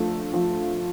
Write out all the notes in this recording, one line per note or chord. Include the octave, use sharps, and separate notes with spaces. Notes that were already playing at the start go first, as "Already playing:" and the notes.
Already playing: F3 A3 D4
F3